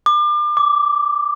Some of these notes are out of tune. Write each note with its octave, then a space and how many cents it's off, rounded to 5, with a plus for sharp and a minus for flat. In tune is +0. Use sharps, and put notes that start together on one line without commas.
D6 +35
D6 -10